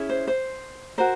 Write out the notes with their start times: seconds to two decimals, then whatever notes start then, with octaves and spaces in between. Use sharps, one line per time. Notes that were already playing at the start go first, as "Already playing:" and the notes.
Already playing: C#4 E4 G#4
0.09 C5
0.27 C5
0.98 F#4 A#4 C5